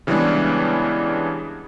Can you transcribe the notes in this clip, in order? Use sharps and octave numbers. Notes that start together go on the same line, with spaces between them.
C#3 E3 G3 G#3 B3 D4